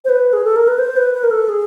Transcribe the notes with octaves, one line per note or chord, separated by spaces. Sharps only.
C5
B4
G#4
A4
A#4
B4
C5
B4
B4
A#4
A4
G#4